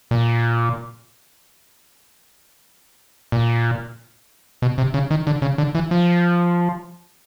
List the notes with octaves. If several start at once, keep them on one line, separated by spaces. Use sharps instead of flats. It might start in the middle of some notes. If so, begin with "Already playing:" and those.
A#2
A#2
B2
C3
C#3
D#3
D3
C#3
D3
E3
F3